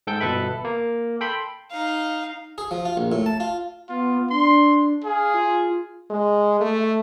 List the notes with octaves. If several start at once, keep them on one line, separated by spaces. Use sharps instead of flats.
G#2 A4 G5 G6
G1 B2 A4 B4 E5 B5
A#3
A4 G5 B5 C6
D#4 F5
G#4
F3
F4
A#1
A2
A5
F4
B3 F4
D4 C6
G#4 F5
F4
G#3
A3